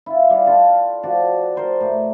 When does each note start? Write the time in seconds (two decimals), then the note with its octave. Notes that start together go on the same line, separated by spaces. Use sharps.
0.06 E4 F4
0.30 G3 F5
0.46 D4 F4 A4
1.03 F3 F#4 D5
1.56 A#4 C5 D5
1.80 A2